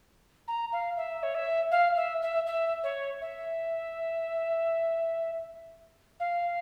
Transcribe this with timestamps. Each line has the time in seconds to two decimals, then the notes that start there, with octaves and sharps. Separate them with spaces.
0.48 A#5
0.72 F5
0.97 E5
1.23 C#5
1.35 E5
1.71 F5
1.96 E5
2.22 E5
2.46 E5
2.83 C#5
3.21 E5
6.20 F5